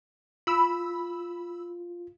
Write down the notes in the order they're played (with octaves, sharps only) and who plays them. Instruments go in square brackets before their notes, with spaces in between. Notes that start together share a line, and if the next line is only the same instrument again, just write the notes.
[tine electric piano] F4 [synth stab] B5 E6